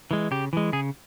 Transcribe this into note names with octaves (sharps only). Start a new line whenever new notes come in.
E3 G#3
C#3 G4
E3 G#3
C#3 G#4